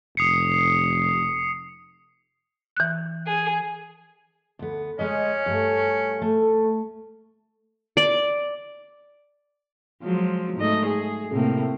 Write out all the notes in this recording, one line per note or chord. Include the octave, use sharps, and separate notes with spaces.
F1 D#6 C7 C#7
E3 F#6
G#4
D2 B3
G#3 C#4 B4 D#5
G2 A3
A3
D5
F3 F#3 G#3
G#2 A3 D#5
G#4
A2 C3 A#3